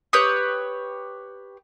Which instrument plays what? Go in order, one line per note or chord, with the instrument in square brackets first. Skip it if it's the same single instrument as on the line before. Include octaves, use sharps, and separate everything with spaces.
[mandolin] G4 B4 C#5 D#6